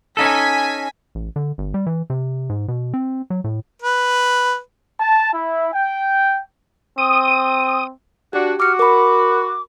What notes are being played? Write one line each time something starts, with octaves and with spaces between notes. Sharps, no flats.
C#4 D#4 A4 G#5 B6
A1
D3
G1
G3
E3
C3
G#2
B2
C4
F#3
A2
B4
A5
E4
G5
C4 D#6
D4 F#4 G4
F#4 D6 F6 C#7
A#4 B5 D6